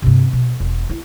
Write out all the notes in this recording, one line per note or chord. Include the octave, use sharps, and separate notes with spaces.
G2 C3
B2
E1
E4